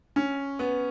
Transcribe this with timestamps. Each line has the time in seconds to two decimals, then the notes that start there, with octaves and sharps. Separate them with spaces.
0.16 C#4
0.59 B3